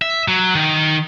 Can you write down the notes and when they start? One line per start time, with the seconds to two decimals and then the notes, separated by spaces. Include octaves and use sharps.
0.02 E5
0.28 F#3
0.55 D#3